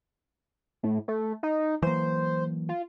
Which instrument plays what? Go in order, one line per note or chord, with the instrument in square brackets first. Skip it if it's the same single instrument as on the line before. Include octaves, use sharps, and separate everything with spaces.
[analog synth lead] A2
A3
D#4
[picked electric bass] E3 F#3 A#3 [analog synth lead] C5
[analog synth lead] F4